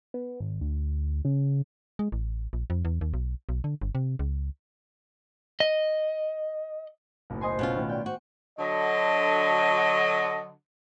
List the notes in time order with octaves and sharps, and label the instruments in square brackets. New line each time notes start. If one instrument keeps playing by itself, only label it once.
[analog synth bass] B3
G#1
D2
C#3
[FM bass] G#3
A1
A#1
F2
E2
D#2
B1
B1
D3
G1
C3
C#2
[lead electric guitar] D#5
[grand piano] F#1 B1 A2
[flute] C5 [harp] D#5 G#5 C6
[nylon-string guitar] B2 C#4 F4
[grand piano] A2 D#3
[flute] D5 [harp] G5
[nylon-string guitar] F#4 [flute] C5
[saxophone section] D3 F#3 [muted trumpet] D#5